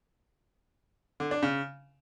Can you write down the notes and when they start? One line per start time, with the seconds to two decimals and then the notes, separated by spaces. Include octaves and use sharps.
1.20 D3
1.31 D4
1.43 C#3